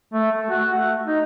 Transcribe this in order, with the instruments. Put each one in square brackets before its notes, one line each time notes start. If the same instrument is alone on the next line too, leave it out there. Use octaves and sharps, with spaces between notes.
[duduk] A3
A3
F#4
A3
D#4